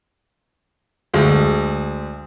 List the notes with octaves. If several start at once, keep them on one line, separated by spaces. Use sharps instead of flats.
D2 G#3